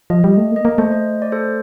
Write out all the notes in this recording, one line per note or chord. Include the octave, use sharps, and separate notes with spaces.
F3 D#5
G3
A3 D#5
A#3
D#5
A#3
A3 C5 D#5
C5 D#5
D5
A4 C5